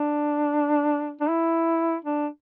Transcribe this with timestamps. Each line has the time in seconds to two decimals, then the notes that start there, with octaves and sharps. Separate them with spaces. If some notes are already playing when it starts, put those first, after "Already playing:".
Already playing: D4
1.21 D4
1.29 E4
2.05 D4